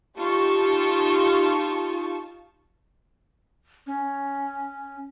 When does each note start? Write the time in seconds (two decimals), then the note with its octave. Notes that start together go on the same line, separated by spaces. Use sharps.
0.17 D#4 F4 G4 A5 C#6
3.87 C#4